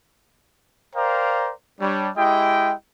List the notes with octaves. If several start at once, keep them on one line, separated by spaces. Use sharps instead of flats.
A#4 C5 D5 F5 G5 A#5
G3 D4 C#5
G#3 E4 G4 D#5 G5